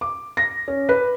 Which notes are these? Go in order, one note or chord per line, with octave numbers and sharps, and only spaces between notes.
D6
A#6
C#4
B4